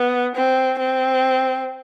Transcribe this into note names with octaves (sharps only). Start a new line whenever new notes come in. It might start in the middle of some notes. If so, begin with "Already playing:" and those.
Already playing: B3
C4
C4